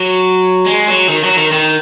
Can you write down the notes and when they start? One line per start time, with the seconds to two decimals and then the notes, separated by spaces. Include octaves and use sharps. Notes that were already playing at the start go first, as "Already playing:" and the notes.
Already playing: F#3
0.66 G#3
0.88 F#3
1.09 D#3
1.24 F#3
1.38 D#3
1.52 D#3